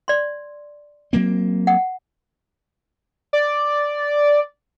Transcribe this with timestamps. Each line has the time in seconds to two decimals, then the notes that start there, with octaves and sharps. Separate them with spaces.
0.08 D5 C6
1.13 F#3 A#3 C4
1.67 F#5
3.33 D5